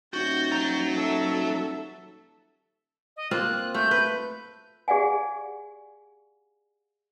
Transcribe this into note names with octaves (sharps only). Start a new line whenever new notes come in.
D#1 F#4 G6 A6
F#3 A#5
A4 E5
D#5
A#3 C4 F4 F#6
A3 G6
B4
G4 G#4 D5 F5 F#5 G#5